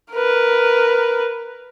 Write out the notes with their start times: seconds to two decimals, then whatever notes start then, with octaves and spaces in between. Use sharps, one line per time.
0.12 A#4 B4